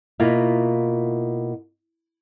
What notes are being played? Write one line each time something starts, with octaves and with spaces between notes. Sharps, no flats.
B2 A#3 E4 F4